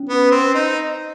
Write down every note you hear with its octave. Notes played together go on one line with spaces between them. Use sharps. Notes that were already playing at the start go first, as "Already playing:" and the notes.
Already playing: C#4
B3
C4
D#4